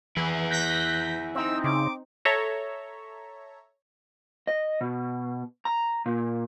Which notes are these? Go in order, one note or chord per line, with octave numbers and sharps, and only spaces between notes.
E3 E4 G#4
F#6 G6 A#6 B6
C4 D#4 E6
C#3 D6
A4 C#5 E5 A#5
D#5
B2
A#5
A#2